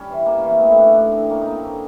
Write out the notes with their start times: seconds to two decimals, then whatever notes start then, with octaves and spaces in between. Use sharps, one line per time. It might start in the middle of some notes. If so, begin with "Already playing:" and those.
Already playing: G3 C#4
0.10 E3
0.26 A#3
0.38 C#4
0.43 E3
0.50 C4
0.60 A3 B3
0.71 C4
0.77 A3 D4
0.83 C#4
0.94 A2 D4
1.11 A2 C4
1.30 A#3 C#4
1.41 A#3 D#4
1.51 C4
1.63 D3 C#4